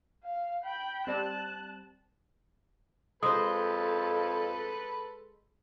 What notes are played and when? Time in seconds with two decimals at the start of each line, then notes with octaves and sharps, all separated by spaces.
0.24 F5
0.65 G5 B5
1.07 G3 C4 A5 F#6
3.23 F2 G#3 A4 B4 C5 D#6